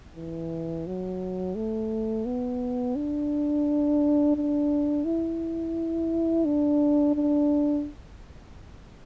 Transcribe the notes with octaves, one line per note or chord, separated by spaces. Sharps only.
E3
F#3
A3
B3
D4
D4
E4
D4
D4